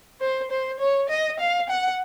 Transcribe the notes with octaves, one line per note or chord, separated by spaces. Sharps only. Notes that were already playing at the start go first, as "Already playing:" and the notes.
C5
C5
C#5
D#5
F5
F#5